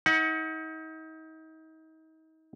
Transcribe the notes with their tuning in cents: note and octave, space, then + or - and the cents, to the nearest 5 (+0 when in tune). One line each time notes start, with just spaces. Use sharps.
D#4 +35 F#5 +0